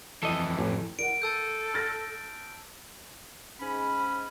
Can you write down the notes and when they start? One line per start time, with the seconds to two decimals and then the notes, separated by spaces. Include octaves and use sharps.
0.23 F2 E3 A4 D#5
0.59 A1
0.99 A#4 F#5 D7
1.22 A4 A5 E6 G6
1.74 F6 A6 A#6
3.60 G#2 C#4 B5